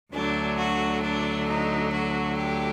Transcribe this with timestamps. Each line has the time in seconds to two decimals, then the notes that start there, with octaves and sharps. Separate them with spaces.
0.13 D2 D3 F#3 D4
0.58 F#4
1.03 D4
1.48 D#4
1.93 F#4
2.37 G4